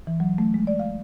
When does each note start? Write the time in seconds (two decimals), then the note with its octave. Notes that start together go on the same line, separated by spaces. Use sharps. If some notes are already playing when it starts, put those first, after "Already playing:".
0.07 E3
0.20 F#3
0.38 A3
0.54 G#3
0.67 D5
0.79 F5